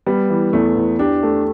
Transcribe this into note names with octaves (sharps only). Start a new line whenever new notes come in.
G3 B3
E3
E2 A3
E2
D4 G4
A3